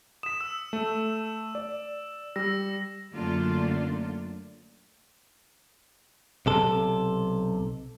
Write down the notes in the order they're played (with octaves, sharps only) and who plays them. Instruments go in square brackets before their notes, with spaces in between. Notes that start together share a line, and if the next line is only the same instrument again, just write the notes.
[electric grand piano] D#6 B6 [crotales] E7
[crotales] E6
[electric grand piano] A3
D5
[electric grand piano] G3 [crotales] E6 A#6
[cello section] F#2 D3 A3 A#3 D4 F4
[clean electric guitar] B1 C3 A4